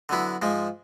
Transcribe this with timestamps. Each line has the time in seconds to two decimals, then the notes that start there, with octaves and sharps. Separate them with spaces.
0.09 D3 F#3 B3 E4
0.42 G#2 F3 G#3